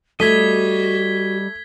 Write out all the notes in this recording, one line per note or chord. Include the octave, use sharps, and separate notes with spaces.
G3 A3 F#4 D#5 G#6 B6 G7